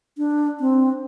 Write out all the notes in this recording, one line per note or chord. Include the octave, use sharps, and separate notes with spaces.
D4
C4